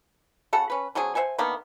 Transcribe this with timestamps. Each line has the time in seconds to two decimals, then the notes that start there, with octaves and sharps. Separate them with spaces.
0.53 C#3 F#4 A4 F#5
0.70 C#4 B4
0.95 D3 F#3 C4 G#4
1.15 C5 E5 F#5 G#5
1.38 D3 D#3 A#3 B3